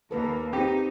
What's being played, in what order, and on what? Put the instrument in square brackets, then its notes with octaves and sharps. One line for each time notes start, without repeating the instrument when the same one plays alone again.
[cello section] D#2 A#3 [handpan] A4 B4
[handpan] C4 [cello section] D#4 [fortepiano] G4